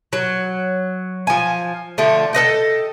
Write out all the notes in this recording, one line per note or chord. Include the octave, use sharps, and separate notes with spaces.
F#3
F3 G#5
D3 F3 A3
A4 B4 D#5 G5